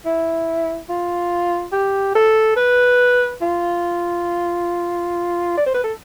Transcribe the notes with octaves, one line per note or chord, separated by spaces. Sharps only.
E4
F4
G4
A4
B4
F4
D5
C5
B4
A4